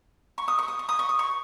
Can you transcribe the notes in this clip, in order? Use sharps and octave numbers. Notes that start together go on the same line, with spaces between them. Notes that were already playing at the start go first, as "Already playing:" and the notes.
C#6
D#6
C#6
D#6
C#6
D#6
C#6
D#6
C#6